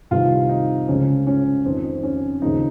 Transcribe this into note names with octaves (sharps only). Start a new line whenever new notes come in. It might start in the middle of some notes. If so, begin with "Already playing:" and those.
C2 C3 D#3 F4
D#4
C#2 C#3 F3 C#4
C#4
F2 D#3 C4
C#4
D#2 C#3 F3 D#4